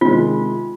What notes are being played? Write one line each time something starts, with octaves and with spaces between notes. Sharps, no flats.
C3 D#3 G#3 F4